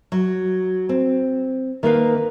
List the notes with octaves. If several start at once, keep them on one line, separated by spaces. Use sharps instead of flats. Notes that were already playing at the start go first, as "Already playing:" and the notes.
F#3
C4
D#3 A#3 B4 F5